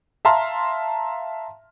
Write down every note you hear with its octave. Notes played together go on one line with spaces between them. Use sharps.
E5 F5 A5 A#5 C6 F6